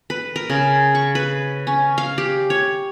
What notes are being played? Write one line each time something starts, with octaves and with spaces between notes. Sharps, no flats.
B4
A#4
C#3
C#6
B4
C#4
F5
G4
C#5